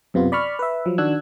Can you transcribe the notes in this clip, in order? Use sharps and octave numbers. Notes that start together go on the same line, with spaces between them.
F#2 C3 B3 F4
D5 B5 C#6 F6
B4 E5
F3 F#3
D#3 D4 F#4 E6 F#6 G#6